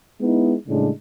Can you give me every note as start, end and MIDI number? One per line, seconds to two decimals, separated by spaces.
0.20 0.55 56
0.20 0.55 59
0.20 0.55 63
0.20 0.55 64
0.68 0.89 45
0.68 0.89 49
0.68 0.89 55
0.68 0.89 56
0.68 0.89 62